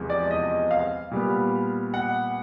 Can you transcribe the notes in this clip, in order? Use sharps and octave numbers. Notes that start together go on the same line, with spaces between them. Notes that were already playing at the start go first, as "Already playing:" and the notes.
Already playing: E2 C3 F3 G#3
D5
D#5
F5
A#2 G3 B3
F#5